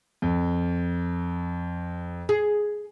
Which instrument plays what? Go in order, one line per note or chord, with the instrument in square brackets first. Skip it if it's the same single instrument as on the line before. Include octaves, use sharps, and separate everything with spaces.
[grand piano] F2
[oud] G#4